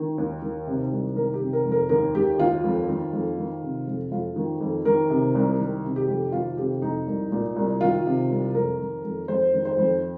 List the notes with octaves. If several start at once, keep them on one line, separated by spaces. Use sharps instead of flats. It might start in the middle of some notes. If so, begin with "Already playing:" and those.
Already playing: D#3
D#2
D#3
C3
C2
D#3 A#4
G4
C3
A#4
F2
A#4
D#2 A#4
D#3 G4
D#2 F4
F2
D#3
F2
D#3
C3
F2
F2 F4
D#3
F2
D#3 A#4
C3
C2
D#3
C3
G4
F2
D#3 F4
C3 G4
F2 D#4
C2
A#2
C2
D#3 F4
C3
C2
F2 A#4
D#3
F2
F2 C5
D#3
C5
F2